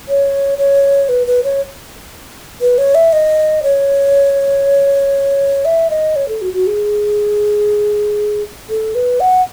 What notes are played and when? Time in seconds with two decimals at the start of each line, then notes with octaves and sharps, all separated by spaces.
0.09 C#5
0.58 C#5
1.09 B4
1.27 B4
1.44 C#5
2.61 B4
2.78 C#5
2.95 E5
3.13 D#5
3.63 C#5
5.65 E5
5.90 D#5
6.16 C#5
6.28 A4
6.42 F#4
6.53 F#4
6.67 G#4
8.70 A4
8.95 B4
9.20 F#5